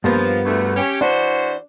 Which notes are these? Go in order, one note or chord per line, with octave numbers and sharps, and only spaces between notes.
G2 F3 A#3 B3
D2 A3
C#4 G4
E3 D4 F#4 C5